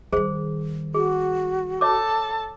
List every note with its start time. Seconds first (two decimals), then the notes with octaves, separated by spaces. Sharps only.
0.13 D#3 G3 G#4 C5
0.95 F#4 G#4
1.81 A4 C#5 A5 D6